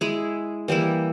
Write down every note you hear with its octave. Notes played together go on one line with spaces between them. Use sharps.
G#3 E4 G#4
E3 G3 A#3 E4